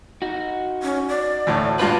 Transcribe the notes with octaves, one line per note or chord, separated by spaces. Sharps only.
D#4 F#4
C#4
D5
D2 A2
G2 A#2 D4 F4 B4 F5